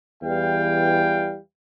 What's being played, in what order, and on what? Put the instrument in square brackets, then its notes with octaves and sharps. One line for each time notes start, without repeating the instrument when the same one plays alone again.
[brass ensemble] E2 E3 G3 F5 G5